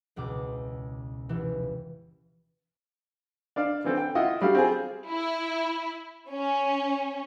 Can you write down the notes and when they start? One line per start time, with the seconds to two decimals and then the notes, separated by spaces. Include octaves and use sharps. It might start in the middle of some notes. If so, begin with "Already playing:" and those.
0.16 E1 C#2 B2 D6
1.29 F1 E3
3.56 D4 D5 F5
3.84 D3 E3 C4 A4
3.97 G5
4.15 E4 F4 D#5 E5 F#5
4.41 F#3 G3 D4 G4 A4 F5
4.55 C4 F4 G#4
5.09 E4
6.30 C#4